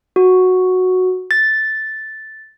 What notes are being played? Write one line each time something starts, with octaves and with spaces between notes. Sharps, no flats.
F#4
A6